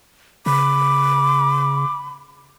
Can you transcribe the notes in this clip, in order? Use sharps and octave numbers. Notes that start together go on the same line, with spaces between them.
C#3 B5 D6